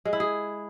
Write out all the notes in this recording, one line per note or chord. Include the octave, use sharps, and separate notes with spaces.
G#3
E4
G#4